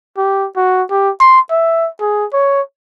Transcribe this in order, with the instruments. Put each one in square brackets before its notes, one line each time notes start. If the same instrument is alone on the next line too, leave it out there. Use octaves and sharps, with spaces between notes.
[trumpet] G4
F#4
G4
C6
E5
G#4
C#5